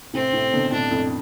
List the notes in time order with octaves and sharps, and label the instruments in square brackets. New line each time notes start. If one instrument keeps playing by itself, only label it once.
[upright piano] A2 C3 [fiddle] C4
[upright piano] A2 C3
B2 D3
[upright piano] A2 C3 [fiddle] D4
[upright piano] F2 A2